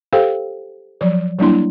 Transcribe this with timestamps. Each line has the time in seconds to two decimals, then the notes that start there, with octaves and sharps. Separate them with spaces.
0.13 G4 A4 C5 F5 G5
1.01 F3 F#3 D5
1.39 F#3 G3 A#3 D4 E4 C6